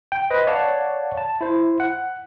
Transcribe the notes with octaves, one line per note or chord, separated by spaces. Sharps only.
G5
B4 C5 D#5
C#5 D5 F5 F#5 A5
A5
E4 C5
F#5